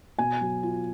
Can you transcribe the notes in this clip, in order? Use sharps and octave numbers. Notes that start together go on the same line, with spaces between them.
B2 G#5
F#3
F4